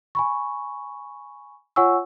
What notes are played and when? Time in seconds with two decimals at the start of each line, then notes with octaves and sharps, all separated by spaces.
0.15 G#5 B5 C#6
1.76 F4 C#5 F#5 G#5 C#6 E6